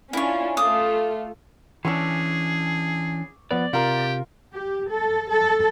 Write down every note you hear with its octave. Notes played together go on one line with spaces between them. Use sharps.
C#4 D4 E4 F4 C#5
A3 F4 D6 D#6
E3 C#4 D4 G#4 C#6 D6 E6
F3 B3 B4 D5
C3 F4 G4 A#4
G4
A4
A4